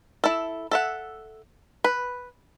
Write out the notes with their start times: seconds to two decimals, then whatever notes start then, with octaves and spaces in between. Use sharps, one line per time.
0.24 E4 A4
0.71 A4 E5 F#5
1.84 B4